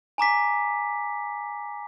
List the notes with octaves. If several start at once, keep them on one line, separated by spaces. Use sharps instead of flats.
G#5 A#5 D6 B6